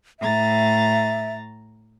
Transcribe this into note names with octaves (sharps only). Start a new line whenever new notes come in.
A2 E5 A#5 A6